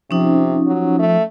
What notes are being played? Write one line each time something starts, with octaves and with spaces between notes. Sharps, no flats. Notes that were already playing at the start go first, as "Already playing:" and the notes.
C3 F3 C#4 D#4
F#3
A3